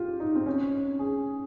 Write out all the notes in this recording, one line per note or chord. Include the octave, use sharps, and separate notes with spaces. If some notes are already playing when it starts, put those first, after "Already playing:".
Already playing: F4 G4
D#4
C4
C#4
G#4